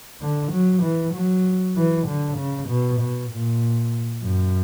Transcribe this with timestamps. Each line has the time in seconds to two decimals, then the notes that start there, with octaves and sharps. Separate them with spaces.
0.21 D3
0.52 F#3
0.83 E3
1.15 F#3
1.77 E3
2.08 D3
2.38 C#3
2.69 B2
3.00 B2
3.31 A#2
4.24 F#2